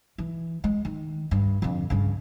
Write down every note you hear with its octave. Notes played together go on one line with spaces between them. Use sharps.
E3
G#3
D#3
G2
F2 D3
G2 C#3